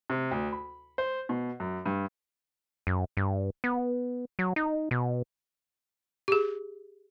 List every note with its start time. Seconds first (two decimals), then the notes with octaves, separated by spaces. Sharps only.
0.10 C3
0.31 D2
0.53 B5
0.98 C5
1.29 B2
1.60 F#2
1.86 G2
2.87 F#2
3.17 G2
3.64 B3
4.39 F#3
4.56 D#4
4.91 B2
6.28 G4 G#4